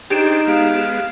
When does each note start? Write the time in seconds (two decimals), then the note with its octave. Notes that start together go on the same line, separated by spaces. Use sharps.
0.10 D4 D#4 G4 G#4 C5 D7 E7
0.47 G#3 B3 F5